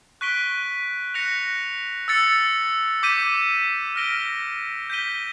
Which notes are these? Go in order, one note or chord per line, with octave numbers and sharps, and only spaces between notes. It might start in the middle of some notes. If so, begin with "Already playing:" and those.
C#6 F#6 B6 D7 G7
F#6 A#6 C#7 F7
E6 A6 C#7
D6 G6 B6 D#7
F6 A#6 D7 G7
G6 B6 D#7 G7